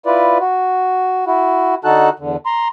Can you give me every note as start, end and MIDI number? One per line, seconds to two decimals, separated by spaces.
0.06 0.38 64
0.06 0.38 65
0.06 0.38 71
0.06 0.38 74
0.41 1.25 66
1.27 1.75 64
1.27 1.75 66
1.85 2.10 50
1.85 2.10 63
1.85 2.10 66
1.85 2.10 69
1.85 2.10 81
1.85 2.10 90
2.19 2.36 40
2.19 2.36 50
2.46 2.68 82
2.46 2.68 84